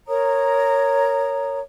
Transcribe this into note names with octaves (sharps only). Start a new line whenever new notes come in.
A#4 C#5 A#5 D#6